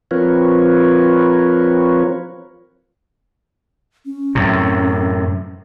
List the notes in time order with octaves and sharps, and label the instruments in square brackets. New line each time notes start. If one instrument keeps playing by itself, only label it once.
[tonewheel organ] F3 C4 F4 A#4 B4 C#5
[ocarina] C#4
[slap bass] F#2 A2 C3